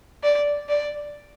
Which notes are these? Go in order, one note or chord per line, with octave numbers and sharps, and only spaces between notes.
D5
D5